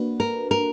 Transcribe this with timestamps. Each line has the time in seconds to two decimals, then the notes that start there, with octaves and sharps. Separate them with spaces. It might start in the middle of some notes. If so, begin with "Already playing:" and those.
Already playing: A#3 D4 F#4 B4
0.20 A#4
0.51 A#4